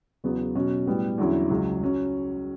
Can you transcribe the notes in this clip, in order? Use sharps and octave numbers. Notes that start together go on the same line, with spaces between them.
E2 C#3 F#3 B3
B2 F#3 C#4 F#4
A2 G3 B3
E2 D3 F#3 C#4 E4
C#2 C#3 F#3
F#3 C#4